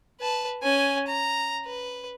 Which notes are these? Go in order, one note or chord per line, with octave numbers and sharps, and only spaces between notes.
B4 A5
C#4 G#5
A#5
B4